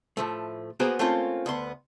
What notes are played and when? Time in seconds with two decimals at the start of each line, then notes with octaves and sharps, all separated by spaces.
0.17 A2 F3 A3
0.80 A#3 B3 F#4 G#4 A#4 C5
0.99 A3 A#3 C4 C#4 F4
1.46 D2 B3 C6